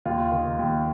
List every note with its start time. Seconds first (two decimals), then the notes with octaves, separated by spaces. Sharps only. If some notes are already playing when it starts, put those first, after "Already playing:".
0.05 D#2 F4
0.32 D#3
0.59 D#2